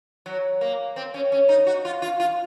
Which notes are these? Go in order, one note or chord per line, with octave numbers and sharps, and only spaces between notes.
F#3
A#3
C4
C#4
C#4
D#4
F#4
F4
F4
F4